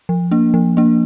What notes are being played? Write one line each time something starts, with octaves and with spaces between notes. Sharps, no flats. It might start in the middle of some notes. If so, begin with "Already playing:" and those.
F3
A#3 D4
F3
A#3 D4